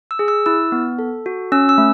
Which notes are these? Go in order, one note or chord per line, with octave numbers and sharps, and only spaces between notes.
E6
G#4
E6
E4 E6
B3
A4
F#4
C#4 E6
E6
A3